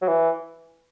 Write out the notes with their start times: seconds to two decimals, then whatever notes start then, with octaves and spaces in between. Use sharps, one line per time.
0.02 F#3
0.08 E3